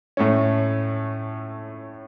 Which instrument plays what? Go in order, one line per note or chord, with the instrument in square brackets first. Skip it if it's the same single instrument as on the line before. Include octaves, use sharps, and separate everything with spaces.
[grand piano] A2 A3 C#4